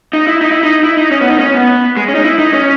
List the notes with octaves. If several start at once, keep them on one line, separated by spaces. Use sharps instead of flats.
D#4
E4
D#4
E4
D#4
E4
D#4
C#4
B3
D#4
C#4
B3
G#3
C#4
D#4
E4
D#4
C#4